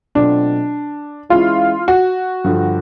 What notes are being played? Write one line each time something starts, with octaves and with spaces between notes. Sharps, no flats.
B2 F#3 A3 C4 D4 F4
E3 G#3 C#4 E4 F4
F#4
G2 D3 F3